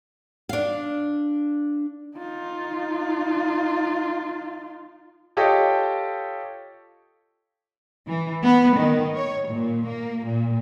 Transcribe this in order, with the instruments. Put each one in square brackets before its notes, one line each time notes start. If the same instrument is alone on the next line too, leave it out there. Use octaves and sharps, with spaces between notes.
[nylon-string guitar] D4 F5
[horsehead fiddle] D#4 F4
[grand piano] F4 G4 A4 C#5 D#5 G5
[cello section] E3
B3
D#3
C#5
A#2
A#3
A#2